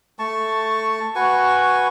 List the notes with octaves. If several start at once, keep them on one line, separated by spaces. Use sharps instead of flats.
A3 A5 C#6
F#4 B4 G#5 C#6